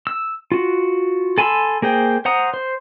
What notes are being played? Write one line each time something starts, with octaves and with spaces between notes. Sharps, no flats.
E6
F4 F#4
A4 G#5 B5 C6 E6
A#3 G#4 C5 G5
C5 F#5 A#5 D#6
C5